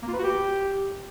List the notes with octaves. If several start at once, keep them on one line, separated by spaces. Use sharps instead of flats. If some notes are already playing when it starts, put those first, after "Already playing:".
A#3
F4
B4
F#4
G4